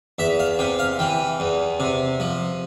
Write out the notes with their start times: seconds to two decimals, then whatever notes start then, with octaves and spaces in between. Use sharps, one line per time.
0.19 E2 E5
0.39 F5
0.59 C3 G5
0.79 F5
0.99 E3 G5
1.40 E2
1.80 C3
2.20 F3